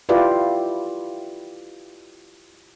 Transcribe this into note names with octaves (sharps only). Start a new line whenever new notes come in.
E4 F4 G4 B4 D5